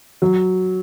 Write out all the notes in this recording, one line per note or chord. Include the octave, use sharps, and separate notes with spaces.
F#3